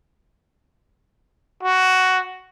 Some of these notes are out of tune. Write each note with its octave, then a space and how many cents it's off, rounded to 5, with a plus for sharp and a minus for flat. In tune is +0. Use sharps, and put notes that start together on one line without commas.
F#4 +10